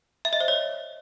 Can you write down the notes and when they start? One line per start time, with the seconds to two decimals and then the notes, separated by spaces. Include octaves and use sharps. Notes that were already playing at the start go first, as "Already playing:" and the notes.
0.25 E5
0.33 D#5
0.40 C5
0.48 C#5